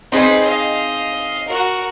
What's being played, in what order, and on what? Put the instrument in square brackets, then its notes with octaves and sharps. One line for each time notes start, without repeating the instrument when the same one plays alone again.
[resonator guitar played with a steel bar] C4 D#4 G#4 [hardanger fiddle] B4 C5
[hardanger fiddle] D#5 F5
F#4 A#4